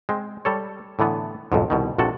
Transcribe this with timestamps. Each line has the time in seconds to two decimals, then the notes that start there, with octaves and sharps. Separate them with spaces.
0.09 G#3 C4
0.45 G3 A4 C#5
0.99 A2 D3 E3 B3
1.52 B1 F2 G#2
1.70 C2 B2 D#3
1.98 A#1 C3 F#4 A4